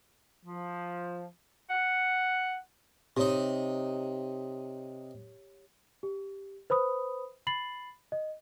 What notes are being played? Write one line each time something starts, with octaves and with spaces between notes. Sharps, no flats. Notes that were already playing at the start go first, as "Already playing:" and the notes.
F3
F#5
C3 D#4 G4 C#5
G4
B4 C5 B5 D#6
B5 A6 C7 F#7
D#5